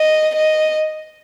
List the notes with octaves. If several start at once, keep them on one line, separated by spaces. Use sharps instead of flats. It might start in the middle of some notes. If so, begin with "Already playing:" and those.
Already playing: D#5
D#5